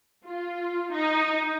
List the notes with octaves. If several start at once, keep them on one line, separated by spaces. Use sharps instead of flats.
F4
D#4